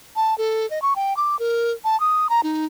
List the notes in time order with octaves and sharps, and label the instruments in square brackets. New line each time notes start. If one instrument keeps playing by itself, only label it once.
[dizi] A5
A4
D#5
C#6
G5
D6
A#4
A5
D#6
A#5
D#4